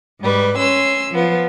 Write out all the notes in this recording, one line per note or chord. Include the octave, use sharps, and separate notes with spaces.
G#2 G3 B4
C#4 C6 E6
F3 B3